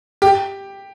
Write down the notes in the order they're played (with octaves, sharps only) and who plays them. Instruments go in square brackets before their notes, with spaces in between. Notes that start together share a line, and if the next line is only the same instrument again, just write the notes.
[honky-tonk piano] G4